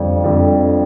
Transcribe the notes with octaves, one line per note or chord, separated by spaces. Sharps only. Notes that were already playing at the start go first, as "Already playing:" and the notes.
Already playing: F2 D3 G3
F2 D3 G3